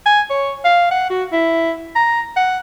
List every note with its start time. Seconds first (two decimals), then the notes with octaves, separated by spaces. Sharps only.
0.06 G#5
0.30 C#5
0.65 F5
0.91 F#5
1.10 F#4
1.32 E4
1.95 A#5
2.36 F#5